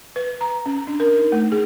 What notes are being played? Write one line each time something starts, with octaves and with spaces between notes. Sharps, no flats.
B4
A#5
C#4
D4
A#4
D#4
A3
G#4